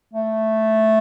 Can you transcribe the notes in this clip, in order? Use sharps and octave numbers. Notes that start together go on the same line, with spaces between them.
A3